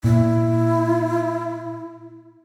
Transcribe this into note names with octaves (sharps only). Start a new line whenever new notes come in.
A#2 E4